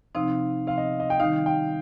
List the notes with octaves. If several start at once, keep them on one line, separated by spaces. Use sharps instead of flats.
C3 F3 C4 D#4 F5
C3 F3 C4 F5
D#5
D#5
G5
D#3 G3 D#4 F5
G5